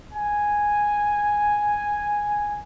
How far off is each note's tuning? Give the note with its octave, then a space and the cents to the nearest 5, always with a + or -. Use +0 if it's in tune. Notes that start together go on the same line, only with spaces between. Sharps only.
G#5 -5